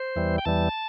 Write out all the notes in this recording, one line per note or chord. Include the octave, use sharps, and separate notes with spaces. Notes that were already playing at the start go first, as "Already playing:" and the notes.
Already playing: C5
E2 E3 G3
G5
E2 E3 G3 A5